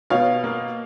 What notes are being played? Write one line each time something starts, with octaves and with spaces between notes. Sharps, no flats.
B2 C#5 F5
A#3